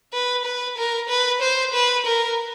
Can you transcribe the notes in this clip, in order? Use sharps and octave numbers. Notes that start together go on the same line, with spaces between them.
B4
B4
A#4
B4
C5
B4
A#4